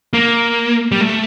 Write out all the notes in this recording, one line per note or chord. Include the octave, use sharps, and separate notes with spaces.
A#3
G3
A3